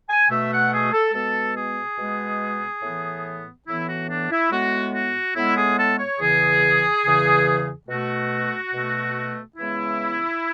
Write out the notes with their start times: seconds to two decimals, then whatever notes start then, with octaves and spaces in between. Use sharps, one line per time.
0.09 G#5
0.30 B2 A3 E5
0.51 F#5
0.72 G#4
0.92 A4
1.13 B2 G#3 B3 A4
1.56 G#4
1.98 B2 G#3 B3
2.83 A2 E3 B3
3.66 A2 E3 B3 E4
3.87 F#4
4.08 D4
4.30 E4
4.50 A2 G#3 B3 F#4
4.93 F#4
5.35 A2 G#3 B3 E4
5.56 G#4
5.77 A4
5.98 C#5
6.19 E2 C#3 E3 G#4
7.04 E2 C#3 E3
7.88 B2 A3 F#4
8.72 B2 A3
9.56 C#3 E3 G#3 B3 E4